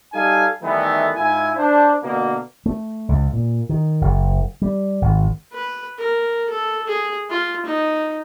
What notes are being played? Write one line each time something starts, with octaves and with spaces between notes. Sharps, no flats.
G3 D#4 A4 F5 G#5
D#3 E3 G3 A3 B3 D#4
G#2 E4 F4 G#5
D4 C5
B2 D3 A#3
A3
C#2
A#2
D#3
F#1
G3
G#1
B4
A#4
A4
G#4
F4
D#4